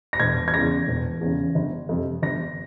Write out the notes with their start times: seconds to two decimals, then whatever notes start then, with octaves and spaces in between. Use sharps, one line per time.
0.13 A#6
0.20 E1 G#6
0.48 G#6
0.54 E2 C#3 A#6
0.88 E1
1.21 E2 C#3
1.55 G1
1.89 F2 C3
2.22 G1 A#6